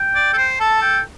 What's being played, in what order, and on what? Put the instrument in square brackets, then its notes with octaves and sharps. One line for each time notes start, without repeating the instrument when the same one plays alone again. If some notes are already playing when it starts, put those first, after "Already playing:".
Already playing: [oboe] G5
[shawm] D5
A4
C5
[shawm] A4 [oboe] A5
[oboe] G5